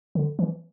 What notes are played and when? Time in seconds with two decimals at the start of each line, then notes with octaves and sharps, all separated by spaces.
0.15 D3
0.39 E3